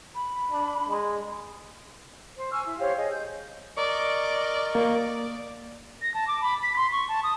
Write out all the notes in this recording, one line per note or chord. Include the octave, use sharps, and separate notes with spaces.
B5
D4
G#3
C5
G#5 C#6 E6 F6
E4
G4 C5 C#5 F5
G#4 D#5
G6
A#4 D5 D#5 C#6
A#3 D5
A#6
A5
D6
B5
B6
C6
C#6
A5
D#6